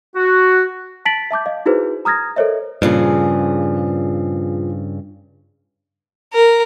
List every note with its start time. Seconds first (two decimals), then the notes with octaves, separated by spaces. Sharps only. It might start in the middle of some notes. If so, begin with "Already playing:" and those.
0.16 F#4
1.05 A5 A6 B6 D7 F#7
1.31 E5 A5 D6 G6
1.46 D#5 F5
1.66 D#4 E4 F#4 G#4 B4 C5
2.05 A#5 D#6 F6 G#6 A#6
2.36 A4 A#4 C5 C#5 D#5 E5
2.82 G2 A#2 C#3 F3 G#4
6.33 A#4